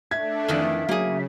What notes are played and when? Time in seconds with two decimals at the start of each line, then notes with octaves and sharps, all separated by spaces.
0.11 A3 D4 E5 G#6
0.48 F2 D#3 E3
0.89 C#3 F#3 A#3 G#4